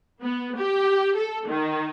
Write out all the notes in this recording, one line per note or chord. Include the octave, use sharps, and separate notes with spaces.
B3
G4
A4
D#3